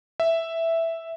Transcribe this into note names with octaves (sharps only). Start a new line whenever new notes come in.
E5